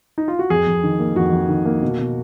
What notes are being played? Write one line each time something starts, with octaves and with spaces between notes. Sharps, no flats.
D#4
F4
F#4
F2 G#4
F2
D#3
A#3
F2 F#4
F2
D#3
A#3
B2
B2